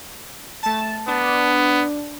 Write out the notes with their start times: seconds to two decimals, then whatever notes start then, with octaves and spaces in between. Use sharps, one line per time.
0.63 A3 A5
1.08 B3 D4